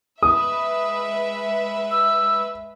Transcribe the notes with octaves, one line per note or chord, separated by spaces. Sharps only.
G#3 B4 E5 D#6
E6